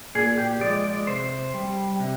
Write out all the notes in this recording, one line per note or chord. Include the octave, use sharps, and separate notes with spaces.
A#2 G#4
G4
F3 G#3 D5
D5
C3 C5
G3
C3